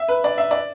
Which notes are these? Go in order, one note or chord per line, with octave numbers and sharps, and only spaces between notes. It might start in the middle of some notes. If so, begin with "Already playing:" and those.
Already playing: E5
B4
D5
E5
D5